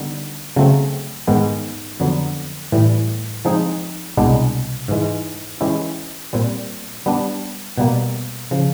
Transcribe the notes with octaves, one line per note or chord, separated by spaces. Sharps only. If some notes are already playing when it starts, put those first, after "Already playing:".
Already playing: D3 G3 B3 D#4
C#3 F#3 A3 C4
G#2 D#3 G#3 B3
F2 D3 F#3 B3
A2 E3 G3
F3 G#3 C4 D#4 G#4
C2 B2 G#3 B3 D4
G#2 E3 G#3
E3 G#3 C#4 E4 G4
A#2 G3 C4
G3 B3 D4
B2 G3 A#3
C#3 F3